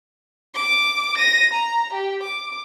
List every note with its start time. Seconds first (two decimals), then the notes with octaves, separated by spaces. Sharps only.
0.55 D6
1.18 A#6 D#7
1.54 A#5
1.94 G4
2.23 D6